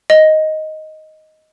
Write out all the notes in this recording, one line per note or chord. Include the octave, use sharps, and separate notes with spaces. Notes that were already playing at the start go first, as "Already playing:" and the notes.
D#5